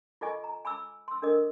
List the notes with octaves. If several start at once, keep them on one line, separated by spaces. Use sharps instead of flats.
F4 A4 D#5 G#5 C#6
A#5
G#5 B5 D6 E6
C6 E6
D4 A4 A#4 D#5 D#6